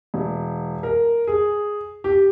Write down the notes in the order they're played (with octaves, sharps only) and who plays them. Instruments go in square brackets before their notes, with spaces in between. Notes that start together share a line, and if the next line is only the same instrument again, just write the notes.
[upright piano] E1
A#4
G#4
G4